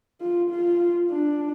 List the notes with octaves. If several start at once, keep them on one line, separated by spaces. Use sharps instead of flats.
F4
F4
D4